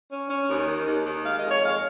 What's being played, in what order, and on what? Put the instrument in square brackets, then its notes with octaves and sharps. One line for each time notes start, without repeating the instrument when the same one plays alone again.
[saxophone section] C#4
C#4
D#2
D#3
D#2
D#2
G#3 F5
F2 D#5
C#5
G#3 F5